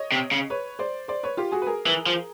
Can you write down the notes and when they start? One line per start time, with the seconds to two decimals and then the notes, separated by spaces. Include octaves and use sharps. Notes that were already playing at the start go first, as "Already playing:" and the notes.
Already playing: C#5 D#5
0.12 C3
0.31 C#3
0.50 B4 C#5
0.79 C5 D5
1.08 C5 D5
1.23 B4 C#5
1.37 F4 G4
1.52 F#4 G#4
1.62 B4
1.66 G#4 A#4
1.86 E3
2.06 F3